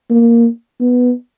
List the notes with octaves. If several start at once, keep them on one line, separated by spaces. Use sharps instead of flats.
A#3
B3